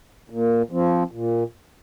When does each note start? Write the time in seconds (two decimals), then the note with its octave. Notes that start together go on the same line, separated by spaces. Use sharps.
0.30 A#2
0.71 F3 C4
1.11 A#2